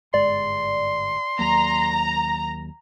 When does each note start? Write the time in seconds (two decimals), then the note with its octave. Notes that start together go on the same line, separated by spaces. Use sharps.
0.14 G1 G#2 G#3 D5 C6
1.39 D#2 F#3 A#3 A#5